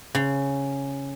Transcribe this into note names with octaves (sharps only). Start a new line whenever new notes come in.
C#3